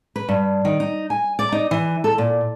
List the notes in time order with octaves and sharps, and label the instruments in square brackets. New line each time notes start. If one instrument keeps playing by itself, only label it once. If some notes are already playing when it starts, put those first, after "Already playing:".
[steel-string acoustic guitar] B4
G2
D#3
D#4
G#5
D5
D#4
E3
A4
A#2